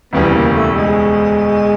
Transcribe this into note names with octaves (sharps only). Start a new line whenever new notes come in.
E1 D2 C#3 E3 G3 B3
A#3
A3
G#3